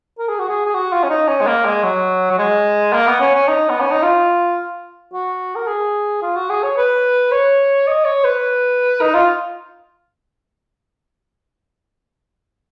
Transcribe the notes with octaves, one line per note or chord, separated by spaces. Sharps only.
A#4
G#4
F#4
G#4
G#4
F#4
F4
C#4
D#4
C#4
G#3
A#3
G#3
F#3
F#3
G#3
A#3
B3
C#4
C#4
D#4
B3
C#4
D#4
F4
F#4
A#4
G#4
F4
F#4
G#4
C#5
B4
C#5
D#5
C#5
B4
D#4
F4